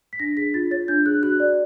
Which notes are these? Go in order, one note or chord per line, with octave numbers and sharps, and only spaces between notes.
B6
D4 A#6
G#4 B6
F4 A6
C#5 A6
D4 G6
G#4 F#6
F#4 F#6
D5